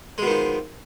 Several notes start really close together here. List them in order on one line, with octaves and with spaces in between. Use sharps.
G#3 B2 D#3 F3